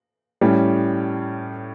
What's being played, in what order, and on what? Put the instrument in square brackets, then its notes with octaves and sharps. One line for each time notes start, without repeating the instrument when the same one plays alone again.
[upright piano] A2 G3 C#4